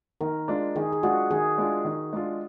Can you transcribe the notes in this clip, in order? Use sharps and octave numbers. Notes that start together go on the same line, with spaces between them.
D#3 A#4
G#3 D4 F4
D#3 G#4
G#4
G#3 D4 F4 F#4
D#3 G#4
G#3 D4 F4
D#3
G#3 D4 F4